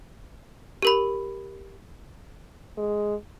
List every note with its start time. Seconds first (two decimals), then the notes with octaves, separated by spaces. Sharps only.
0.82 G4 A#4 B5
2.78 G#3